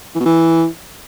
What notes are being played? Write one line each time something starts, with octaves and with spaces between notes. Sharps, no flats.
E3
B2
E3